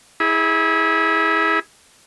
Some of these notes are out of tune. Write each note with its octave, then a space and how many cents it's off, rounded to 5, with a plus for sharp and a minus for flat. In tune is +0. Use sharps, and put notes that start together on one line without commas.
E4 -25 G#4 +0